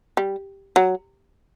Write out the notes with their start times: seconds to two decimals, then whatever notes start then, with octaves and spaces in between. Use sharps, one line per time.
0.17 G3
0.76 F#3